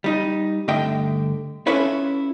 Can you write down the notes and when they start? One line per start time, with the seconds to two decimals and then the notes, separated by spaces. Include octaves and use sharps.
0.04 G3 D#4
0.68 G2 D3 A3 D#5 E5 G5
1.67 C#4 E4 F4 A4 B4 C#5